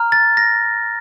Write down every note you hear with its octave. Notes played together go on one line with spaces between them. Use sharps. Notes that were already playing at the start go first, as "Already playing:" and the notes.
Already playing: A#5 F6
A6
A#6